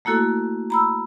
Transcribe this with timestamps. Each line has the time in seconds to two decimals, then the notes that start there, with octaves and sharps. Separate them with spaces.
0.05 A3 A#3 E4 F#4 A4
0.70 A#5 B5 E6